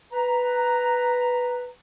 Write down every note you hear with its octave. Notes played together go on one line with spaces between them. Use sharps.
B4 A#5